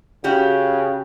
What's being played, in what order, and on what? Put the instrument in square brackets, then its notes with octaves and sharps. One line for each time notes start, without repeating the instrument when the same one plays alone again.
[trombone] C#3 [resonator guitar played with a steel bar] C#4 F#4 G4